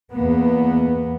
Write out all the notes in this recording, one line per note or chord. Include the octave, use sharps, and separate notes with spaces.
E2 A#3 B3